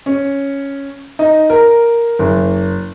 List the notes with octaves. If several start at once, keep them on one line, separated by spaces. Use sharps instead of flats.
C#4
D#4
A#4
F#1